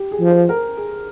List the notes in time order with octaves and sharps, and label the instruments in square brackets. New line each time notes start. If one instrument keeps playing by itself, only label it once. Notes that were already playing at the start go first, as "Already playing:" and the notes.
Already playing: [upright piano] G4
G#4
[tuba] F3
[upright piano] C5
A#4
G#4